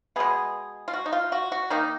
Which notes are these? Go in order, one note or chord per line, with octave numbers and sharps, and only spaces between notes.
B2 G#3 B3 G#4
F4
F#4
D#4
F4
F#4
F#4
D#3 A#3 D#4